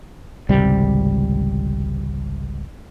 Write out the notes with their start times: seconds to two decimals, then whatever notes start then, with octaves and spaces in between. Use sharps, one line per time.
0.49 G#1 C#2 C3 G3